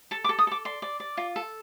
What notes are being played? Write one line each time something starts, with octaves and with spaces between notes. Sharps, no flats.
A4 A5
D6
A4
D#6
A4 D6
D5 C6
D5
D5
F4
A4